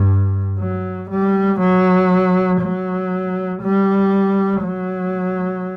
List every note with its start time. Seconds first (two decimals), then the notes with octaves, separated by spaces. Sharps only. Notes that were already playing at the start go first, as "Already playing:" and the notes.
Already playing: G2
0.59 F#3
1.10 G3
1.59 F#3
2.61 F#3
3.63 G3
4.63 F#3